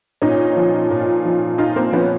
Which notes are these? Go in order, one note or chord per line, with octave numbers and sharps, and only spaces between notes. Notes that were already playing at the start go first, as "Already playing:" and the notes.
A#2 C#4 D#4
F3
A#2
F3
A#2 D#4 F4
A#3 C4
F3 B3 C#4